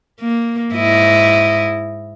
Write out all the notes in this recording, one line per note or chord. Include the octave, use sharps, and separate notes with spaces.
A#3
G#2 E4 D#5